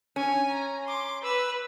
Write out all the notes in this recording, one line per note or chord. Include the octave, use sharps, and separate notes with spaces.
C#4 G#5
A#5
C6 D6
B4 E6